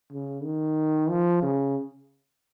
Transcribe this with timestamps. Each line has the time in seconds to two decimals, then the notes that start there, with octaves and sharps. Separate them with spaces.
0.12 C#3
0.44 D#3
1.10 F3
1.42 C#3